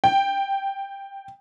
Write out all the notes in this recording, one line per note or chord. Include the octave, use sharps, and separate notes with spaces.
G5